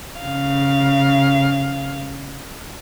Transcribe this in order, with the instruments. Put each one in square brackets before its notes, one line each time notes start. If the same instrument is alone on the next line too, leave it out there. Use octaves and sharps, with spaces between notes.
[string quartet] C#3 F5